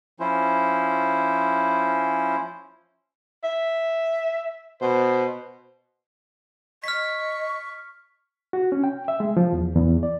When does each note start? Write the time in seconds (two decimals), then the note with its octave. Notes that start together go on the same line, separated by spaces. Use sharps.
0.20 F3 C#4 E4 C5
3.44 E5
4.82 B2 C5
6.84 D#5 C#6 F6 B6
8.53 F#4
8.72 C#4
8.84 G5
9.08 E5
9.20 G#3
9.37 F3
9.53 E2
9.75 E2
10.03 D5